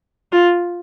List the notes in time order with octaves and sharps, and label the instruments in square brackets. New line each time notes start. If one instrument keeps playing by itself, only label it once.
[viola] F4